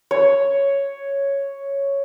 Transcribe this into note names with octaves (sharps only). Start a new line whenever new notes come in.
C#5